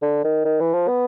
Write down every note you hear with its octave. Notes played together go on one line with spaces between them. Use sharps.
D3
D#3
D#3
E3
F3
B3